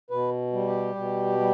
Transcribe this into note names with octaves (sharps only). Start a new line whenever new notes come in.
B2 B4
G3
G4
B2
G3